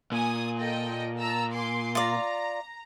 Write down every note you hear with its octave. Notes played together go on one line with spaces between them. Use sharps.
A#2 G#5 D#6
A4 D#5 G5
A5 A#5 E6
G#5 C6 D6
F4 D5 A#5